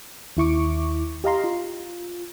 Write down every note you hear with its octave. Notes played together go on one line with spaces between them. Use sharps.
D#2 E4 C#6 D6
G4 D#5 F5 A#5 C6
F4